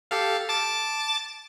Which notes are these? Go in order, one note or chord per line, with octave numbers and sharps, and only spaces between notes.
G4 A4 F5
A5 D6 A6